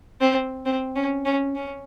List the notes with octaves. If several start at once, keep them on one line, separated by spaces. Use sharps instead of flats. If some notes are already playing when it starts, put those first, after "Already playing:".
C4
C4
C#4
C#4
C#4